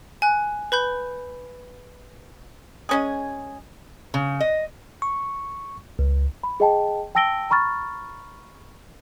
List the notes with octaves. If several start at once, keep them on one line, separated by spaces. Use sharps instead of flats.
G#5 F#6
B4 B5 G6
G#3 C#4 G#4
C#3
D#5
C#6
C#2
B5
G#4 D#5 G5 A5
G5 A5 E6 A#6 D7 G7
A#5 B5 C#6 F6 A6